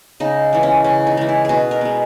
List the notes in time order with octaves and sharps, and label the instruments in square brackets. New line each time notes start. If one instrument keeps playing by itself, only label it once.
[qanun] C#3 D#4
E3 G#3
C#4
C#3 C#4
D#4
E3 G#3
E4
B2 F#4 G#4
A#4
G#3 B3